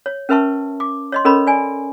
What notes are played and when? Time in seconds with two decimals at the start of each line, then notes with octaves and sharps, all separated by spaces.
0.06 C#5
0.29 C#4 A#4 B4 E5 A5 C#6
0.80 D6
1.12 C#5 D#5 C6
1.25 C#4 A4 A#4 C#5 D#5 B5
1.47 D5 G#5